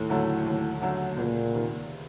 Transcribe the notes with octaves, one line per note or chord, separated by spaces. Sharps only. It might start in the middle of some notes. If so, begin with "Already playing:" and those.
Already playing: D#2 A2
D3 F#3 A3
D#2
D3 F#3 A3
C#2 A#2
C3 D#3